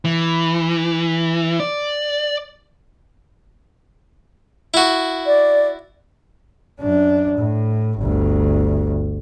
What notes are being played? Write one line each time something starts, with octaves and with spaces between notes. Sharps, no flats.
E3
D5
E4 F#4
D5
F#2 D4
A2
G1 D2